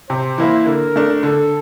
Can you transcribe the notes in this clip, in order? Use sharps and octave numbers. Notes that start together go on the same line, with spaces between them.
C3 C5
E3 A#3 E4
D3 A#4
A3 D4
D3 A4